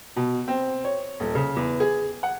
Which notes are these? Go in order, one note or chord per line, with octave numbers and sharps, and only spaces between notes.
B2
C4
C#5
D#1
C#3
E2
G#4
F#5